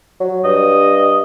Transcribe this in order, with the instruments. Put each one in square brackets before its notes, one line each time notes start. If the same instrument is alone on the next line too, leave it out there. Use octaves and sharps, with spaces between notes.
[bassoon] F#3
[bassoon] G2 [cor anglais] D#5